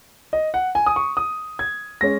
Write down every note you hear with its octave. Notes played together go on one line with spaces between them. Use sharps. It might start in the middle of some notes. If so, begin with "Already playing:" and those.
D#5
F#5
G#5
D#6
C#6
D#6
G#6
G#3 C#4 A#6